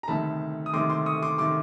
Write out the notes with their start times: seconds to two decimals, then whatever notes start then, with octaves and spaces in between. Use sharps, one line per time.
0.03 A#5
0.08 D2 C3 D#3 A5 B5
0.66 D#6
0.73 D2 C3 D#3 C6 D6
0.90 C6 D6
1.06 C#6 D#6
1.22 C6 D6
1.38 C3 D#3 C6 D6